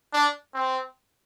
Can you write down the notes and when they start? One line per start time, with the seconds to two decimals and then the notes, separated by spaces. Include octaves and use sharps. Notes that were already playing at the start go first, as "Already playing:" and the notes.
0.13 D4
0.54 C4